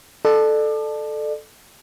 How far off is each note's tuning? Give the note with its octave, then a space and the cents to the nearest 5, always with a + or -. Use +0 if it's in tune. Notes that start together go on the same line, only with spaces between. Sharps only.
A4 -5 D5 +35